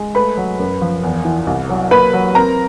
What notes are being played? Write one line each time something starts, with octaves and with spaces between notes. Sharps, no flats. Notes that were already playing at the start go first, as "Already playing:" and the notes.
Already playing: G#3
A3 B4 B5
F#3
F#2
F3
E2
E3
C2
F#3
A#3 B4 B5
F#3
C4 A#4 A#5